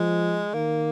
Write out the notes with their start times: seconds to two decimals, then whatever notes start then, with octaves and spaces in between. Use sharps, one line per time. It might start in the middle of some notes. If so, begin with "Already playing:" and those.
Already playing: F3 G#3
0.54 D#3 A#3